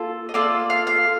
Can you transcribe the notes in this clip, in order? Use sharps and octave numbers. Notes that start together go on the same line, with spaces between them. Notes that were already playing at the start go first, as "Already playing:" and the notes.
Already playing: A#3 F4 A4
D#5
A#3 F4 A4 D5
F5
F5